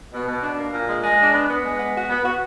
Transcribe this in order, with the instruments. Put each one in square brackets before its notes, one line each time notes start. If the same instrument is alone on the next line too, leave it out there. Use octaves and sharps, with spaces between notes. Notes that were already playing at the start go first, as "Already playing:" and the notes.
[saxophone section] B2
B2
D4
A#3
A#2
G#3
G#3
D4
B3
B3
G#3
B3
F#4
B3
F#4